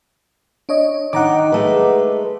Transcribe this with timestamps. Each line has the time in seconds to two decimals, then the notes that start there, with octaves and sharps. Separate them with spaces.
0.69 D4 C#5 D#5
1.13 D#3 D#4 F#5 A#5 D6
1.52 G#3 A3 B4